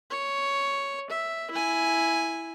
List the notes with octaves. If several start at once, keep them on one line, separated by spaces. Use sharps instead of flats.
C#5
E5
E4 G#5